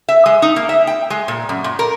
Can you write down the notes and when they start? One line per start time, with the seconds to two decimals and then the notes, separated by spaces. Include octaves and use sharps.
0.09 E5
0.26 G#3
0.42 D#4
0.56 A#3
0.69 E5
0.87 G5
1.10 G#3
1.28 A#2
1.49 F#2
1.64 A#2
1.79 A#4